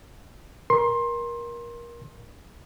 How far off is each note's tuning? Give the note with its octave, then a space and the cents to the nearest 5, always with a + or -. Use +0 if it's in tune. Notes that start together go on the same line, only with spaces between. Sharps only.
A#4 +25 C6 +20